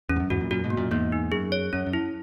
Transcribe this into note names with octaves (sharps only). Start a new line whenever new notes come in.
E2 C#4
G#2
F#2
E2 G#2 F#4
F#2 A#2
F#2 A#2 F#4
G#2 B2
A#3
F#2 A#2
E2 G#2 A#3
D#4
F#2 G#4
C#5
F#2 C#4
F#2
E4